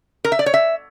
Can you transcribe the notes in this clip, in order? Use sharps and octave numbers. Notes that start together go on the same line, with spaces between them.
A#4
E5
D5
C#5
E5